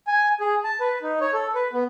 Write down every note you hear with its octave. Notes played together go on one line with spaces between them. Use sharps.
G#5
G#4
A5
B4
D#4
C#5
A4
B4
B3